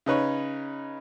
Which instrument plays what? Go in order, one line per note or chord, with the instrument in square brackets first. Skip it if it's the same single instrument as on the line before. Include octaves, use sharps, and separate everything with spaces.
[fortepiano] C#3 D#4 B4 C#5